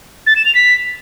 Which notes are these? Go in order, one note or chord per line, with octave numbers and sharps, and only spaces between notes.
A6
E7
F7
B6